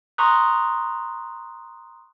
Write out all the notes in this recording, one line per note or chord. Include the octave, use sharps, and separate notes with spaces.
A#5 C6 C#6 D#6 F#6